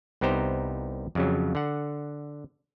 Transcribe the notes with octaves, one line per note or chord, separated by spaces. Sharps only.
C2 B3 D#4 G4 C5 A#5
F2 C#3 F#3
D3 F#5